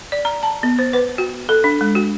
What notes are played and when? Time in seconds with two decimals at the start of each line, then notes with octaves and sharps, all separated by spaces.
0.12 D5
0.25 A#5
0.43 A5
0.63 B3
0.79 C5
0.93 B4
1.18 F#4
1.49 A4
1.64 D4
1.81 G#3
1.95 F#4